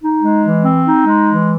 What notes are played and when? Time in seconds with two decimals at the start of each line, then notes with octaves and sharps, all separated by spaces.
0.01 D#4
0.22 G#3
0.42 E3
0.63 C4
0.85 D#4
1.05 G#3
1.27 E3